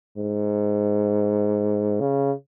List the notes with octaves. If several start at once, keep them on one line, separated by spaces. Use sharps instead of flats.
G#2
C#3